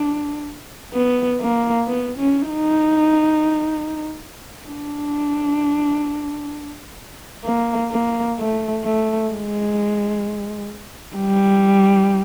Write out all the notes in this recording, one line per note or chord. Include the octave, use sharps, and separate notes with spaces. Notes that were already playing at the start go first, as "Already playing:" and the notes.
Already playing: D4
B3
A#3
B3
C#4
D#4
D4
A#3
A#3
A3
A3
G#3
G3